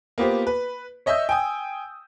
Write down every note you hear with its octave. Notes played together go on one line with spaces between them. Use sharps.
A#3 B3 F4 G4 C5
B4
C#5 D#5 E5 D#6 E6 G6
G5 G#5 D#6